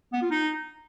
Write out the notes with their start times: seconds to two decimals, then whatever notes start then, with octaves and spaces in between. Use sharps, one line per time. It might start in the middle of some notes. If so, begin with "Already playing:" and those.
0.13 B3
0.22 F4
0.31 D#4